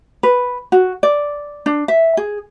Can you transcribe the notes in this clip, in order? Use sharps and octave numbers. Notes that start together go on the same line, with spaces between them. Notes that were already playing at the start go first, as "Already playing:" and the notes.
B4
F#4
D5
D4
E5
G#4